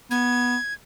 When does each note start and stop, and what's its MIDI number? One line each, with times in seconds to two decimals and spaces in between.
0.11 0.57 59
0.11 0.74 92